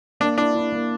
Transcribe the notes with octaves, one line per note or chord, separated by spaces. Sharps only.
A#3 D4
D4 E4
E4
A#3